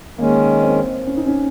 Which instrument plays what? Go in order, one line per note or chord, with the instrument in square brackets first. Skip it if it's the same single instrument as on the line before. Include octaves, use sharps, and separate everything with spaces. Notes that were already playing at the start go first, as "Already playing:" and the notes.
[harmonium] D#3 G#3 C#4 [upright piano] A#3
[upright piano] C4
C#4
D#4
C#4